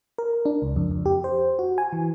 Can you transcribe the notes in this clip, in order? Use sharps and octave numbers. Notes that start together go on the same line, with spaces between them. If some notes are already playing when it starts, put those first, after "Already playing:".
A#4
D4
C#2
F2
F2
G4
C5
F#4
G#5
E3